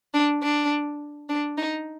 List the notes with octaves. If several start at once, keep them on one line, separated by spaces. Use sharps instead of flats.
D4
D4
D4
D#4